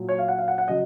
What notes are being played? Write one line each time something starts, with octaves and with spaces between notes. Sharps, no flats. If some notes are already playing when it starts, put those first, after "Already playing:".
Already playing: A#2 F#3
C#5
F5
F#5
F5
F#5
F#5
C#3 F#3 D#5